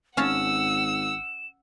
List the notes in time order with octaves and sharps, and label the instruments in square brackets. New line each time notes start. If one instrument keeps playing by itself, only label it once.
[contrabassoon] G#1 [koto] C#4 F5 A5 [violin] F#5 E6 [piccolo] E7